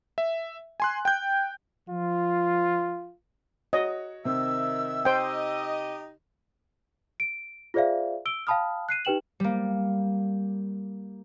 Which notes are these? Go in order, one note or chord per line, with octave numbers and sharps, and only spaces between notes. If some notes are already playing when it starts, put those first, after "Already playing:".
E5
G#5 C6 F#6
G5 G6
F3 F4
F#4 C#5 D#5
C3 D#3 C4 E5 E6
D#4 G4 C5 D#5 G5
D7
F4 G#4 C5 D5 E5 F5
E6 D7 G7
F5 G5 A5 B5 D#6 F6
F#6 C7 D#7
D#4 G4 B4 G5 E7 F#7
G3 A#3